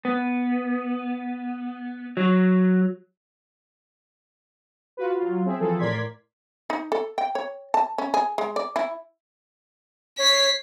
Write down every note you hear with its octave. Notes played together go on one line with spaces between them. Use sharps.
B3
F#3
F4 F#4 B4
F#3 F4
C4 G#4 E5
E3 F3 C4 G#4 A4
A2 A#4 D5 C6 G#6 B6
D#4
A4
G5
C#5
A5
C#4
G#4
G#3
D5
E4
C#5 B6 C7